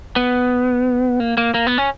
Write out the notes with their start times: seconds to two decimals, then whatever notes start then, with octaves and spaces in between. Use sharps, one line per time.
0.16 B3
1.20 A#3
1.37 A#3
1.54 A#3
1.67 B3
1.78 C#4